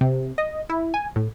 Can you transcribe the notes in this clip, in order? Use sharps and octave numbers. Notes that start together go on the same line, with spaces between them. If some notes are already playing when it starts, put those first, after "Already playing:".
C3
D#5
E4
G#5
A2